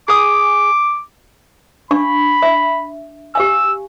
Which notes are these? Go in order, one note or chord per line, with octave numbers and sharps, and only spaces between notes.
G#4 D6 D#6
D4 F5 B5 C#6
E5
G4 F5 G#5 E6